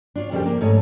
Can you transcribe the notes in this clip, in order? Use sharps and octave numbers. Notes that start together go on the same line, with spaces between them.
D4 F4 C#5
F2 C#3 G3 A#3 C5 G5
A#3 D4
G#2 A3 C#5 D#5